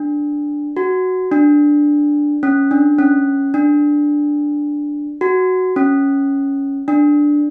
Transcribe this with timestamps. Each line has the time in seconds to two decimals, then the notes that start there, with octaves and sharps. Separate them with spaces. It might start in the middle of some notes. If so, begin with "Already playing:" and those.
Already playing: D4
0.77 F#4
1.32 D4
2.43 C#4
2.71 D4
2.99 C#4
3.54 D4
5.21 F#4
5.76 C#4
6.88 D4